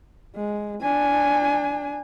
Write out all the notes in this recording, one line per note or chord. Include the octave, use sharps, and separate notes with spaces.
G#3
D4 G#5